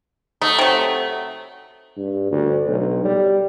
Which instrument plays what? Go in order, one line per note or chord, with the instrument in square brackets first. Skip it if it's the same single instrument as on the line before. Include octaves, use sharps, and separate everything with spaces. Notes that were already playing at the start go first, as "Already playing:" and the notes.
[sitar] A3 [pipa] D#4 F#4
[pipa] C3 F#3
[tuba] G2
D2
B1
G3